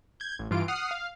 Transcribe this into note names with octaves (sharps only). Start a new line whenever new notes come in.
G6 G#6
A1
G2 E3 F4 D7
F#5 D#6 F6 C7
F5